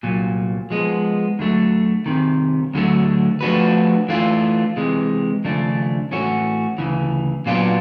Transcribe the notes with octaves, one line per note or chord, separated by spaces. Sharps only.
C2 A#2 F#3
F3 G#3 B3
D2 D3 F#3 A3
C2 C3 D#3
D2 D3 F#3 A3
F3 A3 D4 F#4 B4
E3 A3 D4 F4
C3 E3 G#3
D#2 C#3 F3 A3 D4
A2 E3 A3 C#4 F#4
D2 C#3 E3
A#2 F#3 B3 D4 F4